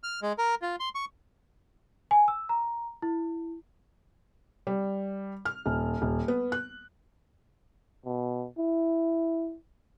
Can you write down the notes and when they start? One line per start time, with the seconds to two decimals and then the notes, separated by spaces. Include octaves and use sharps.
0.03 F6
0.22 G#3
0.38 A#4
0.62 F4
0.80 C6
0.95 C#6
2.11 G#5
2.28 E6
2.49 A#5
3.02 E4
4.67 G3
5.45 F6
5.66 D#1
6.02 D#1
6.28 B3
6.52 F#6
8.05 B2
8.58 E4